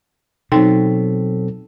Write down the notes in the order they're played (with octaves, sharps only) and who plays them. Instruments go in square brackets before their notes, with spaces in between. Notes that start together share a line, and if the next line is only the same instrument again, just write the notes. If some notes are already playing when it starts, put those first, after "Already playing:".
[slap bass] B2 [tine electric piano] F#3 C4 A4 [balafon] D#4 G5